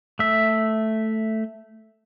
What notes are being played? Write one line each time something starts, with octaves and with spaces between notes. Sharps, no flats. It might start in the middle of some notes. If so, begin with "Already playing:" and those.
A3 E5